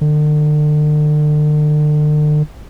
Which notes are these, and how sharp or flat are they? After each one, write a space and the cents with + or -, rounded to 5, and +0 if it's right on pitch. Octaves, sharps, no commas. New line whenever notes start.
D3 +40